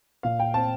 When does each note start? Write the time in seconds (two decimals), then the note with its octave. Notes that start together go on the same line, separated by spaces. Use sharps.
0.23 A#2 F5
0.39 G5
0.54 C4 A5